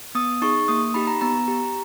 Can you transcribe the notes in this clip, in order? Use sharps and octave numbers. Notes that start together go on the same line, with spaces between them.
B3 D#6
D#4 G#4 C#6
A#3 D#6
D#4 G4 B5
A#5
B3 A#5
G4